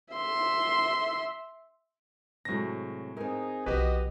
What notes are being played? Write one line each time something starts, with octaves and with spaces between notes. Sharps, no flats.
E5 C6
A2 C3 F#3 G#3 A#6
C4 D#4 G#4 A#4
B1 F3 F#4 G4 B4 D#5